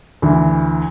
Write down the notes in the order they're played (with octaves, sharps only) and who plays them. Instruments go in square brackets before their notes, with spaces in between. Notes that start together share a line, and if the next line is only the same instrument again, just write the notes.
[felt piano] D2 E3